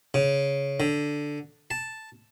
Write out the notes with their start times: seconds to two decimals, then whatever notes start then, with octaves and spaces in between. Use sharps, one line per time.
0.14 C#3
0.80 D3
1.71 A5